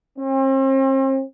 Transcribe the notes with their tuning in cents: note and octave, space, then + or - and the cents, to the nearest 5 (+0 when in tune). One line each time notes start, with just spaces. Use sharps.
C4 +40